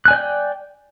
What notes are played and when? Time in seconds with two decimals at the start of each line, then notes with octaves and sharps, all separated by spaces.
0.05 F#6
0.08 G#5
0.11 D5
0.13 G6
0.16 G5